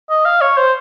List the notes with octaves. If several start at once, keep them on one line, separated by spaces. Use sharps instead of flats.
D#5
F5
C#5
C5